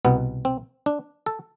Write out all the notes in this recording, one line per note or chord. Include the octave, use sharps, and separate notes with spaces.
C2 B2 B3
C4
D4
A4